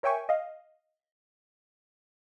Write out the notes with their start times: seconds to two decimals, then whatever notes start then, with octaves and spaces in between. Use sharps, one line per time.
0.03 A#4 C#5 E5 G5 G#5 C#6
0.29 D#5 F5